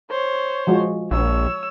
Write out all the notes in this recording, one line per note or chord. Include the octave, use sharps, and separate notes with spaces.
C5 C#5
F3 G#3 F#4
A#1 C#5 E6